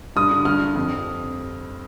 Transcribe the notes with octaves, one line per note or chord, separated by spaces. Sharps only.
G2 D#6
D3
G2 F6
D3
F2